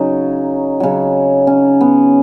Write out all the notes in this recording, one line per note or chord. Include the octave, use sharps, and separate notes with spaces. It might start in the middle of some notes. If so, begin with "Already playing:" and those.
Already playing: C#3 F#3 D#4
C#3 F#3
C#4
B3